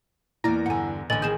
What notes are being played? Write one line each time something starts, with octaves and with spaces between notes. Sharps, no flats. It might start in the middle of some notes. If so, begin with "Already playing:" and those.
E2 A#3 E4 D5 A#5 A#6
G2 D3 F#5 G#5
A1 D3 D4 D#5 G#5 A6 F#7
D#3 G#4 G6 E7